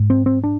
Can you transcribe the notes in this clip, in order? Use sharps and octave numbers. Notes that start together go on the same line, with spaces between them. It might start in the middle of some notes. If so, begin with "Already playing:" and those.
Already playing: G#2
C4
C4
D4